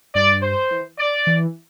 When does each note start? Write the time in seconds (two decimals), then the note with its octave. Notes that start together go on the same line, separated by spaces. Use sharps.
0.15 G2 D5
0.43 C5
0.71 E3
0.99 D5
1.27 E3